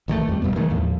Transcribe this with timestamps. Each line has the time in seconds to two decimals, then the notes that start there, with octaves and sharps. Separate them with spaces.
0.08 A1 D#3 G3 A3
0.28 F2 G3
0.42 E1 B2 G3 B3
0.56 D#3 E3 G#3 A3
0.70 D#2 A2 F3